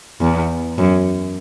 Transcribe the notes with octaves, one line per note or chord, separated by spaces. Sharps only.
E2
F#2